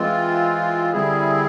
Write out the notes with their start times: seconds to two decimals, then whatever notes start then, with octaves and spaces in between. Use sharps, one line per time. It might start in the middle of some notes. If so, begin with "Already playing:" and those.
Already playing: E3 G#3 C4 F4
0.93 D3 G3 C4 E4 G#4